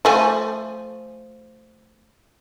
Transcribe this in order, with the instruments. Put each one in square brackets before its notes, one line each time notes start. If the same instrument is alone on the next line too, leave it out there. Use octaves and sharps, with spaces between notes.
[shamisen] F3 A3 G#5